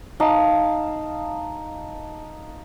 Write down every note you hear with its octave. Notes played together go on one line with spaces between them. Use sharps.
D#4 F5 A5